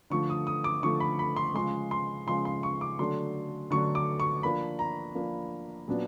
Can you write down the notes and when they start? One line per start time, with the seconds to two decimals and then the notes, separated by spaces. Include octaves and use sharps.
0.10 D3 F3 A3 C#6
0.30 D#6
0.47 D#6
0.64 D6
0.83 D3 F3 A3 C#6
1.00 B5
1.19 B5
1.36 C6
1.54 C#3 F3 G#3 C6
1.91 C6
2.27 C#3 F3 G#3 C6
2.45 C6
2.63 C#6
2.81 D6
2.99 D3 F#3 A3 D4 C6
3.71 D3 F#3 A3 D4 C#6
3.95 D6
4.20 C#6
4.43 F3 A#3 D4 B5
4.79 A#5
5.15 F3 A#3 D4
5.88 A#2 F#3 B3 D4